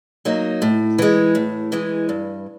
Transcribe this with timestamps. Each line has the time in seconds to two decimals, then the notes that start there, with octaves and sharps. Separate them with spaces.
0.25 F#3 A#3 D#4
0.62 A2
0.98 E3 G#3
1.35 A2
1.72 E3 G#3
2.09 G2